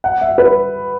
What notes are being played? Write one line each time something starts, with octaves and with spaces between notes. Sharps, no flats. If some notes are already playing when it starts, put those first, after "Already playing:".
F#5
E5
B4